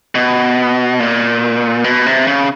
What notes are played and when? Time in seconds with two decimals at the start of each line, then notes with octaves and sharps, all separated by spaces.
0.15 B2
1.00 A#2
1.84 B2
2.06 C3
2.27 C#3